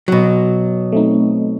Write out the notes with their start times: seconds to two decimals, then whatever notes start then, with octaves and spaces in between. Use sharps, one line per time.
0.08 B2 F#3
0.92 A3 C4 D#4